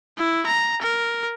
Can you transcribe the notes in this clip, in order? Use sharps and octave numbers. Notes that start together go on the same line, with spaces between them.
E4
A#5
A#4